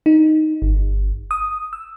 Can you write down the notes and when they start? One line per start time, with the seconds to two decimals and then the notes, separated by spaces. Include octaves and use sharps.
0.06 D#4
0.62 G1
1.31 D#6
1.73 E6